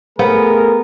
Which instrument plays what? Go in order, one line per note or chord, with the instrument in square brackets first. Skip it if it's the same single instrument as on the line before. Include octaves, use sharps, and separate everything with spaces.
[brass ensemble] A3 G#4 A#4 [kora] B3